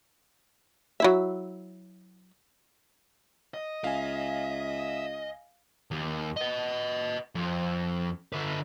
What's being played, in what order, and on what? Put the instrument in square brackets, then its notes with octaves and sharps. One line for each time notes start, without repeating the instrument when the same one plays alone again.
[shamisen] F#3 E4 E5
[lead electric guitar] D#5
[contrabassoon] C#2 [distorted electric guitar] E5 [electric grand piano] F5 G#5
[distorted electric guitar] D#2
B4 D#5
F2
D3 B4